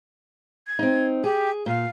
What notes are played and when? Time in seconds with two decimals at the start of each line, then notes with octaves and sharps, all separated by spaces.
0.67 G#6
0.79 C4 D#4
1.24 G4 G#4
1.66 A#2 F5